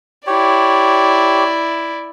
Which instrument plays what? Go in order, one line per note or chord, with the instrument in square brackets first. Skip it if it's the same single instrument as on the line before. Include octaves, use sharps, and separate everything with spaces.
[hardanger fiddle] E4 D5 [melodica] G4 C#5